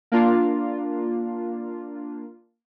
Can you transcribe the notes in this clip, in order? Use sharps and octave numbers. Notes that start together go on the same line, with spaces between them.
A#3 D4 F4